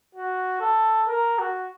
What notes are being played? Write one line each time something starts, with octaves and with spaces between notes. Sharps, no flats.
F#4
A4
A#4
F#4